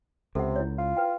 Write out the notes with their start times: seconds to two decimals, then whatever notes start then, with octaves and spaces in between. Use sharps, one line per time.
0.35 C#2 C3 A4 F#5
0.56 E4 C#5
0.78 F4
0.97 B4 G5